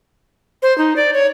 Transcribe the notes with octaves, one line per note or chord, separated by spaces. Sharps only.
C5
D#4
D5
C#5